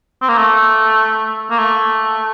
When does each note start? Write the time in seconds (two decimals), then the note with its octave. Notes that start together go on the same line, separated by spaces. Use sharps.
0.22 C4
0.29 A#3
0.38 A3
1.51 A#3
1.59 A3